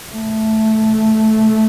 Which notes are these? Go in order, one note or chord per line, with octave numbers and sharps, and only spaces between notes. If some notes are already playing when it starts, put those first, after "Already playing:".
A3